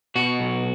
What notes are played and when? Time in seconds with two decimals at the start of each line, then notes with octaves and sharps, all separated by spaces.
0.16 B2 F#4
0.40 B1